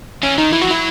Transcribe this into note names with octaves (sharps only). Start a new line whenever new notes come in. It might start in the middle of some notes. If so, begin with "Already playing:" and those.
E3 C#4
D#3 D#4
E3 E4
F#4
F#3 E4